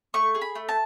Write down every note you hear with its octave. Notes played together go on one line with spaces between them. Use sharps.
A3 C#6
G#4
B5
A3
A5